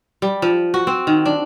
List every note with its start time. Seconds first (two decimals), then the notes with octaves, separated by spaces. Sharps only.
0.22 G3
0.42 F3
0.74 F#4
0.87 C4
1.07 D#3
1.26 D4